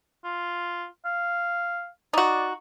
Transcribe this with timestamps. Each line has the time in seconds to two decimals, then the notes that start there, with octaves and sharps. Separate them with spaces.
0.24 F4
1.05 F5
2.13 D#4 F#4 D5